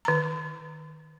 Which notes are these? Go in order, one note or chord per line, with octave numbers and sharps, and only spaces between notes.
D#3 A#5